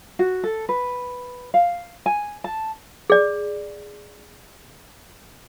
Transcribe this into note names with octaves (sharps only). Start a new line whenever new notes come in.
F#4
A4
B4
F5
G#5
A5
G#4 D5